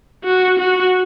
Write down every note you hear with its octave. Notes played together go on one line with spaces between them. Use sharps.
F#4
F#4